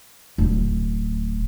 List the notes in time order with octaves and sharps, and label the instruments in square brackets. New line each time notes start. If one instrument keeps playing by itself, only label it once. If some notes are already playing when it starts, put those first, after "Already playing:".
[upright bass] D1